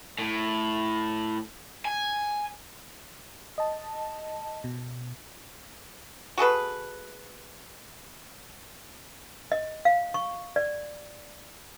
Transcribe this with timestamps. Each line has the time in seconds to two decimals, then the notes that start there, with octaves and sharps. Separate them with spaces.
0.19 A2
1.85 G#5
3.58 D#5 A5
4.64 B2
6.38 F#4 G#4 A4 B4
9.52 D#5
9.85 F5
10.14 C#6
10.56 D5